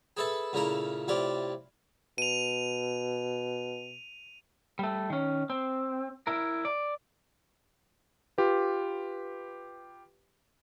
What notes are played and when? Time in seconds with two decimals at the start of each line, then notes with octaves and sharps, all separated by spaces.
0.17 G#4 A4 B4 E5 A5
0.53 A#2 C#3 A3 E4 A#4
1.08 A2 C3 F4 D5
2.18 B2 D#7 F7
4.79 G3 A3
5.10 D#3 C#4
5.50 C4
6.27 E4 A#4
6.65 D5
8.38 F4 G4 B4